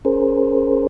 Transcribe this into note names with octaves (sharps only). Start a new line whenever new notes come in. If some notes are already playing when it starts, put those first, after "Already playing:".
C#4 G#4 A#4 C5